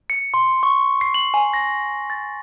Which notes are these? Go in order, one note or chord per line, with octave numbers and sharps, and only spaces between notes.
C#7
C6
C#6
C7
F#7
G#5
A#6
A6